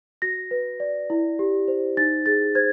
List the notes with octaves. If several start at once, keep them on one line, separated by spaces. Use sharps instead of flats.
F#4 A#6
B4
D5
E4
G4
C5
D#4 A6
G#4 A6
C5 G#6